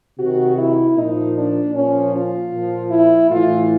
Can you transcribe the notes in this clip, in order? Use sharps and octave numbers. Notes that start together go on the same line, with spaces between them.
C3 D#3 F#4
E4
A#2 F3 D#4
D4
A#2 F3 C#4
F4
A#2 F3
E4
A2 E3 F4